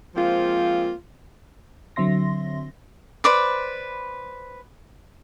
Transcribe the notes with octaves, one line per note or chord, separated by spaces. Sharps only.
F3 G#3 A#3 C4 F4
D3 F#3 C4 E5 C6 A#6
B4 C5 D5 B5